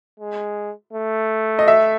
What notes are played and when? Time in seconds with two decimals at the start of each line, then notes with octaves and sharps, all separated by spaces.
0.20 G#3
0.93 A3
1.59 D#5
1.68 E5